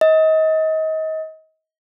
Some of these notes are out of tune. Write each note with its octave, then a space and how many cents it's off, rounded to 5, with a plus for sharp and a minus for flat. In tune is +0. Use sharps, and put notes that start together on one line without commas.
D#5 +30